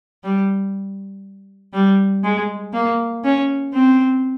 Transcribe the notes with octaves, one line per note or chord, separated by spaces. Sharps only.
G3
G3
G#3
A#3
C#4
C4